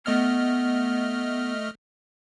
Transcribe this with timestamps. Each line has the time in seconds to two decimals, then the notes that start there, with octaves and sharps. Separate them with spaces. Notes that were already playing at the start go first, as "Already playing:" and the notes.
0.06 A3 B3 D#5 F6